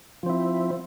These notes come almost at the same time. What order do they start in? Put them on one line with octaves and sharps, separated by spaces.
F3 C4 E4